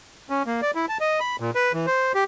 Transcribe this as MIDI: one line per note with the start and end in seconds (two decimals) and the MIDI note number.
0.30 0.43 61
0.46 0.61 58
0.62 0.71 74
0.75 0.86 64
0.89 0.98 81
1.01 1.20 75
1.20 1.36 83
1.40 1.51 46
1.55 1.72 71
1.74 1.86 52
1.87 2.12 72
2.15 2.24 67